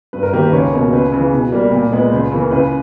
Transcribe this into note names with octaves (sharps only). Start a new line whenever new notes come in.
G2 B4
A#4
D#3 A#3 G4
B4
C#2 C#5
B2 A#3
C#2 B4
C#3 E3
B2
G3 A#3
A#2
G#3 B3
C#2
C#3 E3 A#3
C#2 B4